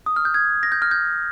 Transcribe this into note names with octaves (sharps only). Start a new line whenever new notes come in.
D#6
F6
G6
G#6
A#6
G6
F6
G6